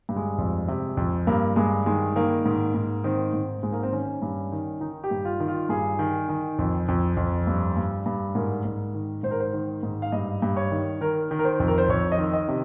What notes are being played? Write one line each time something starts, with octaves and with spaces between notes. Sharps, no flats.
G2
G#3
F2
C3
F2
G2 A#3
G2 G#3
D#3 G#3
D#3 A#3
G#2
G#2
D#3 C4
G#2
G#2 G#3
A#3
C4
D#3 C#4
G2
D#3
D#3 D#4
G4
G2
F4
D#3
F4
G2 G#4
D#3
D#3
F2
F2
F2
G2
G2
G2
G#2 A#4
G#2
D#3
G#2 C5
A#4
C5
D#3
G#2
F5
G2 D#5
G2
C#5
D#3
D#3 A#4
D#3
A#4
C5
F2
A#4
C5
F2 C#5
D#5
D#3
D#5
C3